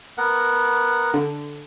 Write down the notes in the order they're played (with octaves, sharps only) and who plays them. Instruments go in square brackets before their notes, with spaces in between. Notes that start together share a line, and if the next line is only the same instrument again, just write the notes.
[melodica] B3 A#4 F#5
[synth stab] D3